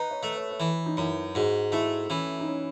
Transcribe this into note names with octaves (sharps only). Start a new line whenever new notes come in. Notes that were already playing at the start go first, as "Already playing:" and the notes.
Already playing: D#4 B4
C#5
A3
C#5
C#5
E3 B4
D#4
F#2 E4
G#2 F#4
A3 E4
E3 C#4
D#4
C#4